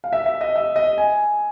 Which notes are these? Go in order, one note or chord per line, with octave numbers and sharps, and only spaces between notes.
F5
E5
E5
D#5
E5
D#5
G#5